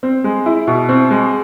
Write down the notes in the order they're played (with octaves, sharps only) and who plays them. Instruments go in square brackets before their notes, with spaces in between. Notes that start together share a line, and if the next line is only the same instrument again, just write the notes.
[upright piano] C4
G#3
E4
B2
C4
G#3